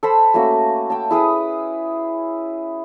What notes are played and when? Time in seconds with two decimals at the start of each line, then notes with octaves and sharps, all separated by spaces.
0.03 A4 C5 B5
0.34 A3 A#3 C#4 F#4
0.90 G5 A5
1.11 E4 G#4 B4 D#6